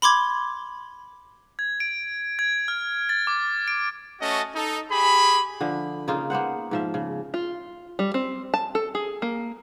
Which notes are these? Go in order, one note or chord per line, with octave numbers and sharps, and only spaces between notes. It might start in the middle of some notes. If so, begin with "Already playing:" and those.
B5 C6 D6 G#6
G#6
D7
G#6
F6
A6
D6
D7
A3 C#4 F#4 D#5 A5
D#4 A4
G4 G#4 B5
D3 F3
C#3 A#3 D#4 F4
A#3 B3 C5 F#5
G#2 F3 E5
C#3
F4
G3
C4
A5
A4
G#4
A#3